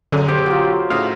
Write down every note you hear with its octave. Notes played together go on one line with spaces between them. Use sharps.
F#2 D3 F#3 C#4 G#4
B1 G4 C5
F#3 F4
A2 C#3 D#4 E5 F5